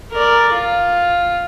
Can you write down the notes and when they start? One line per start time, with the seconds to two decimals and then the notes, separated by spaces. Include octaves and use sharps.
0.12 A#4 D5
0.53 F4